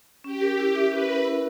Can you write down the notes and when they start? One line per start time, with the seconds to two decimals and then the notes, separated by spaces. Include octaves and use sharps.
0.24 C#4 G4
0.41 A#4
0.59 E4
0.75 E5
0.92 C#4 B4
1.08 A#4
1.25 E4